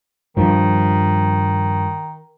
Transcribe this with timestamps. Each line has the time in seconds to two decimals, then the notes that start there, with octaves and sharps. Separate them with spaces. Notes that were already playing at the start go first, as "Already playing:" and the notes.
0.37 G2 D#3 F3